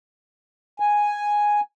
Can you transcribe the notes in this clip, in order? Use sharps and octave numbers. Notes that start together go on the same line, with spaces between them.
G#5